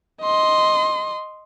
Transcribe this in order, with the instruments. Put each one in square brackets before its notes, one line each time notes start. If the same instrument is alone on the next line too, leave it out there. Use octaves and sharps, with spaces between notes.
[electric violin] D#5 C6